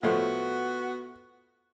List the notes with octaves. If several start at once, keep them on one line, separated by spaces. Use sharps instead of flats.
A2 F3 A3 B3 F#4